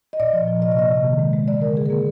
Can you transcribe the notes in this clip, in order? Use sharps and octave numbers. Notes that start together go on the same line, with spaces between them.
D#5
A#2 D5
F3
F3
C3 D#5
D5
A#3 D#5
C3
D#3
G#3
G#3
D3 D5
D3 A#4
D3 G#4
A#3 A#4